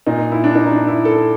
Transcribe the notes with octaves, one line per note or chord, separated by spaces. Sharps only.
A#2 D#4
E4
D4
D#4
D#4
D4
E4
A4